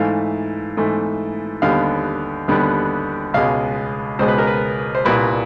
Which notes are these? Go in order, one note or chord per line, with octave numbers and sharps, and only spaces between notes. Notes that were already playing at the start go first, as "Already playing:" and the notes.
Already playing: G#2 E3 A3 F5
G#2 E3 A3
D#2 D3 G3 B3 F5
D#2 D3 G3 B3
C#2 B2 G#3 F5
C#2 B2 G#3 C5
B4
A#4
B4
C5
C2 A#2 G3 B4